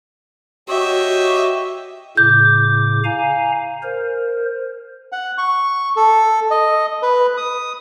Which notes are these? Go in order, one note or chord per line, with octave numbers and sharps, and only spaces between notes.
F#4 G4 C#5 D#5 E5
A2 C#3 D6 G6
F5 G#5 A#5
A#4 C5
F#5
C#6
A4
D#5
B4
D#6